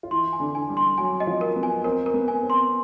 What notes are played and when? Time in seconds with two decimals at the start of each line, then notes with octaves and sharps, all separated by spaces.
0.03 F4
0.11 E3 E4 C6
0.33 G#5
0.40 D3 D4
0.55 G#5
0.69 G3 G4
0.77 C6
0.98 F#3 F#4 G#5
1.20 D#5
1.27 F3 F4
1.41 A#4
1.56 B3
1.63 G#5
1.84 C4 A#4
2.06 A#4
2.14 B3
2.28 G#5
2.43 C4
2.50 C6